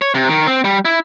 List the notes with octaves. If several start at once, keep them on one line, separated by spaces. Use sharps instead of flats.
C#5
C3
D#3
C4
G3
E4